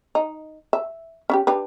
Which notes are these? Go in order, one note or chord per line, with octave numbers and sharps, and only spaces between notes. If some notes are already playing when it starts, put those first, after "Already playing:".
D#4
E5
C#4 E4 G4
D4 G4 B4